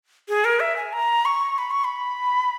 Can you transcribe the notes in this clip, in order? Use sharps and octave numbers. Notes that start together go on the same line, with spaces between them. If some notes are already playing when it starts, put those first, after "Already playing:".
G#4
A#4
E5
G#5
A#5
C#6
B5
C#6
B5